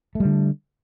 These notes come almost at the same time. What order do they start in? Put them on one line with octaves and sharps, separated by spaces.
A3 G3 D3